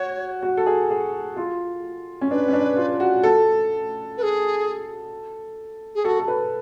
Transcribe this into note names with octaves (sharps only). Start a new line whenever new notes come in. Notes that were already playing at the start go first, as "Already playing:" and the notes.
Already playing: F#4 C#5
F#4
A4
G#4
G#4
F4
C#4
D4 B4
C#4
D4
F4
F#4
A4
B4
G#4
G#4
F#4 A4
A4
B4